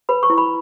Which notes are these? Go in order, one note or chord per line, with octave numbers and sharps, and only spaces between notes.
B4 B5
C#6
E4
B5